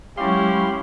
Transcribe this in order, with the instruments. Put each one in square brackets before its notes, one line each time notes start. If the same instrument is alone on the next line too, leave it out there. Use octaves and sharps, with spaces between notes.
[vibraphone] F#3 G#3 C#6 [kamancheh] C#4 E4 [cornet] G4 [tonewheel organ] F5 C6